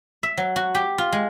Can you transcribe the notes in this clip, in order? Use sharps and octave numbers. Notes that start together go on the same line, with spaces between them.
E5
F#3
F#4
G4
F4
G#3